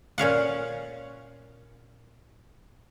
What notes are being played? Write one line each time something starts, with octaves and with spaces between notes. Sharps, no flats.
A#2 C#4 F5 F#5